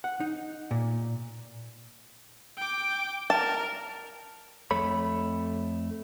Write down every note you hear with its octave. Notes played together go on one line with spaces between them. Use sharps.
F#5
D#4
A#2
G5 D6
A#4 A5
F2 A3 C#5 B5